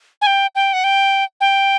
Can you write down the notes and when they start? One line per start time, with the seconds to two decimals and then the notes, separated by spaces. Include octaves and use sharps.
0.22 G#5
0.27 G5
0.55 G5
0.73 F#5
0.84 G5
1.41 G5